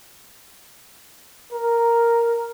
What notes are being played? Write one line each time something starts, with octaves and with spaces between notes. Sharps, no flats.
A#4